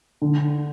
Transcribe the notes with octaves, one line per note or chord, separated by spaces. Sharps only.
D3